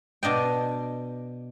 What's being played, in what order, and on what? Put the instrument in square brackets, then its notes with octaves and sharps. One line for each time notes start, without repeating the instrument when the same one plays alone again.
[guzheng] B2 D4 D#5 G5